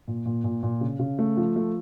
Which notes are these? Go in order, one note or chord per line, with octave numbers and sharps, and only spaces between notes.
A#2
A#2
A#2
A#2
C#3
C#3
A3
F3
A3